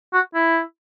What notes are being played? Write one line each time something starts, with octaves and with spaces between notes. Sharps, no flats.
F#4
E4